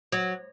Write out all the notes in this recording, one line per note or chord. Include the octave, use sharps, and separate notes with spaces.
F#3